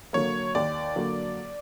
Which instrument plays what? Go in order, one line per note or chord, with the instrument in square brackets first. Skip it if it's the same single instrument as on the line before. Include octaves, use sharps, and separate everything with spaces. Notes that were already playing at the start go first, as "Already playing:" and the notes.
[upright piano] D3 F#3 A#3 [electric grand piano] C#5
[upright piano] D#2 [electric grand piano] D5
[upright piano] D3 F#3 A#3